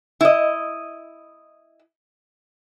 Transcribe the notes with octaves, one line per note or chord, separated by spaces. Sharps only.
E4 D#5